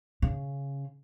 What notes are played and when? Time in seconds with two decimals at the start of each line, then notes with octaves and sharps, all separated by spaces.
0.22 C#3